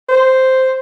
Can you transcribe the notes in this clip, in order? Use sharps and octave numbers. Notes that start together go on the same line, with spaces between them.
C5